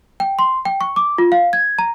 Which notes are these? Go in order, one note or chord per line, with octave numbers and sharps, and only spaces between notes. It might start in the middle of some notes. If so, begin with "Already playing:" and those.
G5
C6
G5
C#6
D6
F4
F5
G#6
A#5